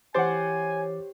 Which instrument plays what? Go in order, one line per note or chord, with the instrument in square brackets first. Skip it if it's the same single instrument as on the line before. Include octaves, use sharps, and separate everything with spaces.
[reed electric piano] E3 D6 A6 [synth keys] G4 C#5 [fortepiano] C5 F#5 [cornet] G#5